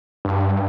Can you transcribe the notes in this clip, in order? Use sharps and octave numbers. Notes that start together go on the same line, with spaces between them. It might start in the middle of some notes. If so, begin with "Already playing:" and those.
G2